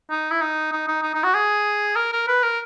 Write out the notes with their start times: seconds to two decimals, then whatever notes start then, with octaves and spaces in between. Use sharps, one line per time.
0.11 D#4
0.31 E4
0.41 D#4
0.72 D#4
0.88 D#4
1.03 D#4
1.14 D#4
1.24 F#4
1.34 G#4
1.96 A#4
2.13 A#4
2.28 B4
2.43 A#4